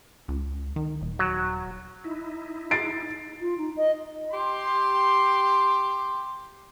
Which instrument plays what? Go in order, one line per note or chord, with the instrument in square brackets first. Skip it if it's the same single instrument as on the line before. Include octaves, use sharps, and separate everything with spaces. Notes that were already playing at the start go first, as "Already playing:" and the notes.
[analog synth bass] C#2
D#3
D#1
[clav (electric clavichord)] F#3
[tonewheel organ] D#4 E4
[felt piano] A6 C7 D7
[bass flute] F4
D#4
D#5
[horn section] G4 C6